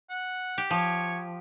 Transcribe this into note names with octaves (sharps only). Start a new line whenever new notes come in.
F#5
G4
F3 C#5